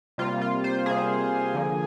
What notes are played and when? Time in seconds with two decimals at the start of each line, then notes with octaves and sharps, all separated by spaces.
0.18 C3 G3 A#3 F4
0.42 F4
0.64 C5
0.86 C3 G3 A#3 G#4
1.54 D3 F3 A#3